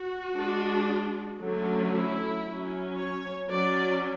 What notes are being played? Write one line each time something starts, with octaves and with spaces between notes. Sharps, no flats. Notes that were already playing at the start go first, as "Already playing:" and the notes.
Already playing: F#4
G#3 D4
D3 F#3 A3 C#4
E4
F#3 C#4
C#5
F#3 C#4 D5